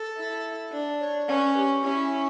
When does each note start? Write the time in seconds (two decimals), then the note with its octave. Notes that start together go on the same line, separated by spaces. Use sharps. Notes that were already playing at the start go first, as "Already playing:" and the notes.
Already playing: A4
0.18 E4
0.72 D4
1.00 C#5
1.28 C#4 B4 C#5
1.56 G4
1.84 C#4 E4